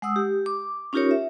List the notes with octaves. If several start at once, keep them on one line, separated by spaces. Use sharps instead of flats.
G#3 F#5 D#6 E6
G4
D6
C#4 D#4 F4 G4 A#4 C#5
E5